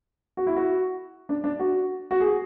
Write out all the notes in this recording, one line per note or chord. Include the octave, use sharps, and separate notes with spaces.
F#4
E4
F#4
D4
D4
F#4
F#4
G#4